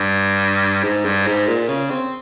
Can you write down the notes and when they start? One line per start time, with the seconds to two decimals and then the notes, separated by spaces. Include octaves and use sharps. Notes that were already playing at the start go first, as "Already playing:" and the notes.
Already playing: G2
0.84 G#2
1.05 G2
1.27 G#2
1.47 A#2
1.68 C#3
1.90 C4